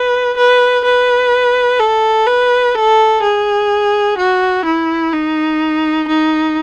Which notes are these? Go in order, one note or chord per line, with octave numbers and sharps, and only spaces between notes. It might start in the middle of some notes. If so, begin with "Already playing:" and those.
Already playing: B4
B4
B4
A4
B4
A4
G#4
F#4
E4
D#4
D#4